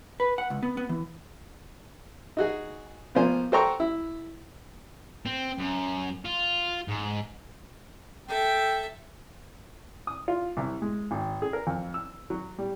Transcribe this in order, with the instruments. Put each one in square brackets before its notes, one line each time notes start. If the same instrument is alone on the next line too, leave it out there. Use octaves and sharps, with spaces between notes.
[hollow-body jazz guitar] B4
F#5
C#2
B3
B3
E3
[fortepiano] D#4 F#4 G#4
B2 F3 A#3 C5 G#5
F#4 A4 C5 G5 A#5 C#6
E4
[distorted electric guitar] C4
F#2
F4
G#2
[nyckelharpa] A4 E5 [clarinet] G5
[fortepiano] D#6
F4
C2
G#3
G#1
G#4
A#4
F2
E6
F#3
G3